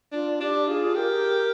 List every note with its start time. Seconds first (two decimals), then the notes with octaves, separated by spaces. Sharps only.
0.12 D4 F4
0.40 D4 G4
0.68 F4 G#4
0.95 G4 A#4